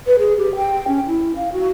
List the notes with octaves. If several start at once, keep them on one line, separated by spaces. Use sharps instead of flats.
B4
G#4
G4
G5
C#4
E4
F5
F#4